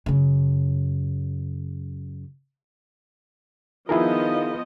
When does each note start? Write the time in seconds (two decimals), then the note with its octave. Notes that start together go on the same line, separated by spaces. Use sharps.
0.06 F#2 C#3
3.89 D#3 F3 B3 E4 F4 G#4 A#4 D#5